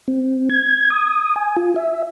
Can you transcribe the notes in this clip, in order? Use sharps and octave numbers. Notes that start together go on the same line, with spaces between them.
C4
G#6
D#6
G#5
F4
E5